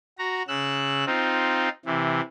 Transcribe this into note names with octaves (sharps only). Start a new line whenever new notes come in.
F#4 A#5
C#3 E6 F#6
C4 D#4 F4
C3 E3